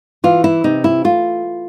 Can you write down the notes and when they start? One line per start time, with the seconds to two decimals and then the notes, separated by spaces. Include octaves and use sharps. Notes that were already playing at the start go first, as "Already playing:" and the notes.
0.24 E3 F4
0.44 E4
0.64 C3 D#4
0.84 E4
1.04 A3 F4